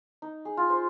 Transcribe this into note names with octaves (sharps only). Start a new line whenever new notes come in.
D#4
G#4
F4
C5